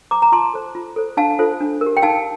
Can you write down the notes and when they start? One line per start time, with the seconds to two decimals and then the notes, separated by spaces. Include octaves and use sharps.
0.11 C5 A#5 D6
0.22 A#5
0.32 F4 A5 C6
0.53 A4 C5
0.75 F4
0.96 A4 C5
1.17 D4 F5 A5
1.39 F4 A4 C5
1.61 D4
1.81 A#4
1.86 G4
1.97 G5
2.02 D#4 F5 A5